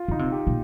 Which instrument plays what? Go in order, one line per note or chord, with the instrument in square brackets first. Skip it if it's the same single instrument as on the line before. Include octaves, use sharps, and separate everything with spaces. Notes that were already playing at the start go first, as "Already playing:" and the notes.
Already playing: [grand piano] F4
[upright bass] D3 [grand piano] D#4
[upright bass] C3
[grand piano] G4
[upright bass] A#2